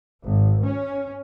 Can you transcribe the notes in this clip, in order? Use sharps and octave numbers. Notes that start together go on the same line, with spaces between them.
G#1
C#4